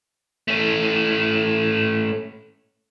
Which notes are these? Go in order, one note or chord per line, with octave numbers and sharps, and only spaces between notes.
A3 C#4